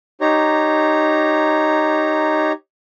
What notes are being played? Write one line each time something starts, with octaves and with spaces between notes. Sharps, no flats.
D#4 G4 C#5 A#5